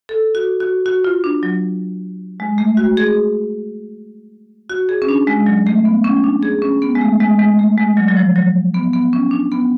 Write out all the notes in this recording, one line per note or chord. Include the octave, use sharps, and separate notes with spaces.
A4
F#4
F#4
F#4
F4
D4
F#3
G#3
A3
F#4
G#4
F#4
G#4
C#4
D4
G#3
F#3
A3
B3
C#4
D4
G#4
C#4
B3
G#3
A3
G#3
G#3
A3
G#3
F#3
F#3
F3
F#3
B3
B3
C#4
D4
B3